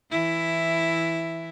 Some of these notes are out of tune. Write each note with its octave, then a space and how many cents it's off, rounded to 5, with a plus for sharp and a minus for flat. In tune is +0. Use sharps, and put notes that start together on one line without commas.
E3 +0 E4 +5